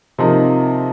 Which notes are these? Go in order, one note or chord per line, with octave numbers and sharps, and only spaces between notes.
C3 F3 A#3 D#4